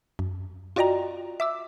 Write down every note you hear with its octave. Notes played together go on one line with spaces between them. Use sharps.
F#2
F4 F#4 D5 D#5 G5 A#5
E5 D6 E6